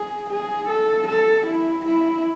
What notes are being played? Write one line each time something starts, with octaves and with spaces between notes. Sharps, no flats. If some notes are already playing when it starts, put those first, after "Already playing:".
Already playing: G#4
G#4
A4
A4
E4
E4